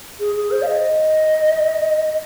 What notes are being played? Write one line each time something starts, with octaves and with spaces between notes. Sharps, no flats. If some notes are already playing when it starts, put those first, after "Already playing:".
G#4
G#4
C5
F5
D#5